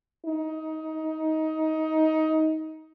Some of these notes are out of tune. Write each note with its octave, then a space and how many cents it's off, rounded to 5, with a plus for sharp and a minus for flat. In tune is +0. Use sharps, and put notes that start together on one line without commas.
D#4 +20